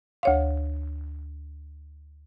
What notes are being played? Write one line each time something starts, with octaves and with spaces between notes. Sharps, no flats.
D2 C#5 F5